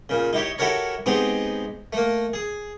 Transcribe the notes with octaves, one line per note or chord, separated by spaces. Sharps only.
A#2 C#3
D#4 E4 G4 C#5
E4 F#4 G4 A4 A#4 C#5
G#3 B3 C4 D#4 G4
A3 A#3
G#4